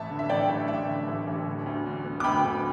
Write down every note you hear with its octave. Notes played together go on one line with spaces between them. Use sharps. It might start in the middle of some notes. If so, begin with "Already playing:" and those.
Already playing: A1 E5 A5
D3
E5
A1 D5 G5
A1
A1 E5
D3
A1
A1
D3
D2
D3
B3
D6
D2 G5 B5
D2